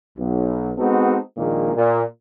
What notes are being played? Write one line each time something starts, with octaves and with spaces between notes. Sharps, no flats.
B1
G#3 B3 C4 D#4 F#4 A4
A#1 A#2 D#3 G#3 A#3
A#2